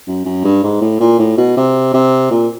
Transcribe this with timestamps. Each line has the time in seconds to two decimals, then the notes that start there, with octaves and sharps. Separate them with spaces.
0.07 F#2
0.25 F#2
0.44 G2
0.64 G#2
0.82 A2
1.00 A#2
1.19 A2
1.38 B2
1.57 C3
1.94 C3
2.31 A#2